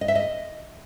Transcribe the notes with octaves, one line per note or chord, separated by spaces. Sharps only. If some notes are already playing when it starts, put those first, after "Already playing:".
D#5
E5
D#5